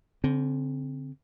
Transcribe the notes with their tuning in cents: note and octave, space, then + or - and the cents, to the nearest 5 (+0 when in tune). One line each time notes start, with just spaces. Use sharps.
D3 -40 C4 +0